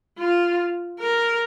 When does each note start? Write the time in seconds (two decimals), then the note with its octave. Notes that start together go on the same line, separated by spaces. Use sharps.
0.19 F4
0.99 A#4